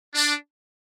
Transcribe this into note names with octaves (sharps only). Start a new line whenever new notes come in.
D4